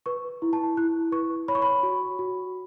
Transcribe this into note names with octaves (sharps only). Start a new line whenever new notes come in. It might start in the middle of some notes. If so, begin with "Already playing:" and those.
B4 C#6
E4
A5
E4 F#6
B4 C#6
C#5 B5
C#6
B5
F#4
F#4